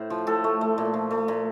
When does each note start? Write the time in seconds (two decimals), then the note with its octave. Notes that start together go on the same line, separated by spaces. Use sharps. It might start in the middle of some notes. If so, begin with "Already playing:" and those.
Already playing: A2 C5
0.10 F3
0.27 A2 A4
0.44 A3
0.61 A3
0.78 A#2
0.94 F3
1.11 A3
1.28 A#2